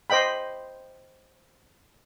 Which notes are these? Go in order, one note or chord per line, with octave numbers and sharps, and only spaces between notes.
C5 D#5 G5 B5